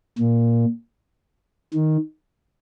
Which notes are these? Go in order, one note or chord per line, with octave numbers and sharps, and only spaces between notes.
A#2
D#3